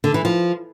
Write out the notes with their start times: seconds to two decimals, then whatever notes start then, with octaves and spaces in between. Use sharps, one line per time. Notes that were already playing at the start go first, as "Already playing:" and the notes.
0.04 D3
0.14 E3
0.25 F3